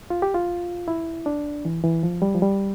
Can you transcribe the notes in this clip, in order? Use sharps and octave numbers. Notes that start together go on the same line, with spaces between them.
F4
G4
F4
E4
D4
E3
E3
F3
G3
F3
G3